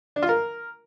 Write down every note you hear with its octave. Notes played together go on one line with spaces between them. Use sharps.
D4
F4
A#4